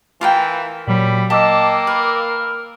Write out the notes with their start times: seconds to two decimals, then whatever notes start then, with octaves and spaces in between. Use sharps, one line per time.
0.21 E3 F4 A#4 G5
0.87 A#2 F#3 G3 B5
1.30 A#3 D#5 G5 A5 D6 E6
1.87 A#4 B4